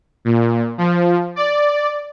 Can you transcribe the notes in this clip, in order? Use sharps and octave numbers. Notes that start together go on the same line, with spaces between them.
A#2
F3
D5